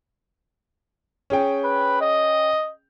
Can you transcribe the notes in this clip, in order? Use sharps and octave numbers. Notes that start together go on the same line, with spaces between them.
C#4 G#4 G5
B4
D#5